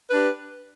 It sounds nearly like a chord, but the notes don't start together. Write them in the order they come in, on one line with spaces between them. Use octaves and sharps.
B4 D4 G4